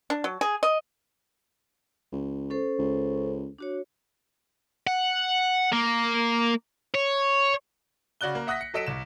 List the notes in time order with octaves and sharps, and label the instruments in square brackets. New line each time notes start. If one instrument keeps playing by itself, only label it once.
[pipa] D4
F#3
G#4
D#5
[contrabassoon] C#2
[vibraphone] C#4 A4 C5
[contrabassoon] C#2
[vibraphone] D4 F#4 C#5
[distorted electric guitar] F#5
A#3
C#5
[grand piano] C#3 F#4 D5 F#6 G7
A#3
E5 F#5 D#6 F#6 A#6 B6
C#7
F#3 A4 D#5 B6 D7 E7
C2 E7